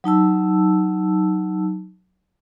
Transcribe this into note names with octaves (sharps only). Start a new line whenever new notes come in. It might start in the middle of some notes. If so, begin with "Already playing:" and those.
F#3 D#4 A5 E6